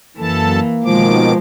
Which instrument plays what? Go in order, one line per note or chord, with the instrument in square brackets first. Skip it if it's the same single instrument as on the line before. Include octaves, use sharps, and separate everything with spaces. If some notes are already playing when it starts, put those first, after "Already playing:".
[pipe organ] F#2 A4 A5 [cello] E3 [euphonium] A#3
[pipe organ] B2 D#3 D6 [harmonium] F3 [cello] G#3